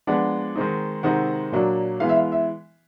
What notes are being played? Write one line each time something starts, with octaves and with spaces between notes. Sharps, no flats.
F3 G#3 B3 D4 F#5
D#3 G#3 C4 D#4
C3 D#3 G#3 C4 D#4 F#5
A#2 F#3 A#3 D4
E3 G#3 B3 F5
E5
F5
E5